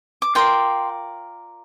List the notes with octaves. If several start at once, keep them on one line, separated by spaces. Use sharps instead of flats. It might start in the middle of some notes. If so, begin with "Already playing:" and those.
D6
F4 A#4 D5 G5 C6